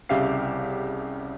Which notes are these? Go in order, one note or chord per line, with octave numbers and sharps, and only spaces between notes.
C2 C#3 G4 E5 F5 C7